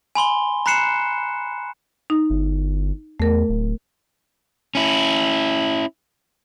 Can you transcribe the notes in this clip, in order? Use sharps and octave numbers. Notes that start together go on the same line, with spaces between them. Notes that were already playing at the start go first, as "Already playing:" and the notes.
G#5 B5 C6 G7
A#5 B5 F#6 C7 C#7 E7
D#4
G1
E2 A3 A#4
D1
C#4 E4